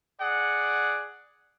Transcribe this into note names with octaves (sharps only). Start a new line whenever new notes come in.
G#4 D5 F#5